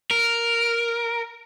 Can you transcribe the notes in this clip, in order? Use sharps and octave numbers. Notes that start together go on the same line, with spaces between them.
A#4